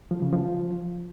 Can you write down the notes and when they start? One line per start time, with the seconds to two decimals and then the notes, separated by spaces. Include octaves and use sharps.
0.11 F3
0.22 C#3
0.33 F3